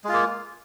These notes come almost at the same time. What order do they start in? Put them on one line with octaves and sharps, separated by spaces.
G#3 F4 A#3